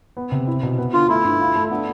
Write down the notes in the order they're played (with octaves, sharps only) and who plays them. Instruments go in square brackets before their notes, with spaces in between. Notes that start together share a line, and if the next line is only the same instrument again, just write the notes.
[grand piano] B3
C3
E4
B2
B3
[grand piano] D3 [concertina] F4
[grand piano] A3 [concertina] E4
[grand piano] G2
F4
A3
[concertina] B3 [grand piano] D4